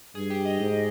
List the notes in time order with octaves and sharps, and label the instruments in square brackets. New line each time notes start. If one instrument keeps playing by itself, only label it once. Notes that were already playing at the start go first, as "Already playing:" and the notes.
[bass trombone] G2 [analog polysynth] G#4
[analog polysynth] G4
D#5
[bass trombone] G#2